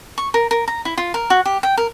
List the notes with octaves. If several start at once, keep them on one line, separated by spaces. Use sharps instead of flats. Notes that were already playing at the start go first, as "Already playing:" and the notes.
C#6
A#4
A#4
A#5
E4
F4
A#4
F#4
G4
G5
A#4